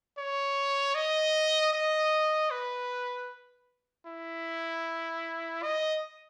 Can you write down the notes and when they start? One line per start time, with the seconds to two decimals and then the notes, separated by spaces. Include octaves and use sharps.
0.18 C#5
0.95 D#5
1.73 D#5
2.51 B4
4.06 E4
5.63 D#5